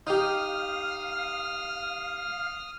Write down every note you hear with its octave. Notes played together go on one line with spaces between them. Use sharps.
D#4 G4 F5 D#6 F6